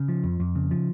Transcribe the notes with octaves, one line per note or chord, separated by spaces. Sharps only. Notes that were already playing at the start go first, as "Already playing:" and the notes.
Already playing: C#3
F3
F2
F2
C#3
F3